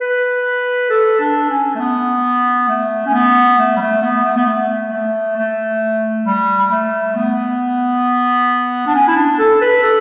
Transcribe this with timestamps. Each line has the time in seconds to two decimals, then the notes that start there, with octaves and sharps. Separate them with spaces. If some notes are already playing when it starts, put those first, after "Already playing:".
0.01 B4
0.90 A4
1.20 D4
1.50 C#4
1.75 A3
1.80 B3
2.69 A3
3.06 C#4
3.13 B3
3.58 A3
3.76 G3
3.80 A3
4.02 B3
4.25 A3
4.37 B3
4.47 A3
4.92 A3
5.37 A3
6.26 G3
6.60 G3
6.71 A3
7.16 B3
8.87 D4
8.94 C#4
9.08 E4
9.16 D4
9.39 A4
9.61 B4
9.83 A4